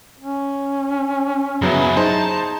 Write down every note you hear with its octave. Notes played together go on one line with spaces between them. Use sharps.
C#4
F#2 C#3 F#3 B3 E4
D#4 G#4 C5 A5